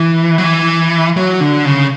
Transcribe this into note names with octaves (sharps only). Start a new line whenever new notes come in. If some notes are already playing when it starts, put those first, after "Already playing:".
Already playing: E3
F#3
E3
F#3
D3
C#3